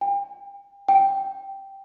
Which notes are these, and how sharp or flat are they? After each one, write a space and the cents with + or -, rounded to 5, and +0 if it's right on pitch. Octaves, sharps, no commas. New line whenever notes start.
G5 +35
G5 -5